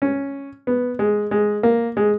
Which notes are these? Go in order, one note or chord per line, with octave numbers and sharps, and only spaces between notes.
C#4
B3
G#3
G#3
A#3
G#3